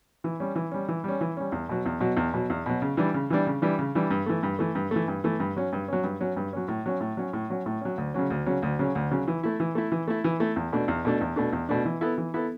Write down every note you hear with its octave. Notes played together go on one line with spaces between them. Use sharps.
E3
G3 C#4
E3
G3 C#4
E3
G3 C#4
E3
G3 C#4
E2
B2 F#3
E2
B2 F#3
E2
B2 F#3
E2
B2 F#3
C#3
E3 G3 D4
C#3
E3 G3 D4
C#3
E3 G3 D4
C#3
E3 G3 D4
G2
E3 A3
G2
E3 A3
G2
E3 A3
G2
E3 A3
G2
F#3 C#4
G2
F#3 C#4
G2
F#3 C#4
G2
F#3 C#4
A2
F#3 C#4
A2
F#3 C#4
A2
F#3 C#4
A2
F#3 C#4
D2
C#3 F#3 C#4
D2
C#3 F#3 C#4
D2
C#3 F#3 C#4
D2
C#3 F#3 C#4
E3
A3 E4
E3
A3 E4
E3
A3 E4
E3
A3 E4
E2
B2 A3 D4
E2
B2 A3 D4
E2
B2 A3 D4
E2
B2 A3 D4
E3
B3 E4 A4
E3
B3 E4 A4